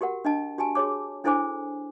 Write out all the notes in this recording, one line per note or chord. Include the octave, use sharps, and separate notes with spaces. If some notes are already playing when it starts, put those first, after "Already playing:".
F#4 G4 A#4 F#5
D4 D#5 A5
F#4 G4 G#5 A5
F#4 G#4 C#5 D6
D4 E4 A4 C5 G#5 D6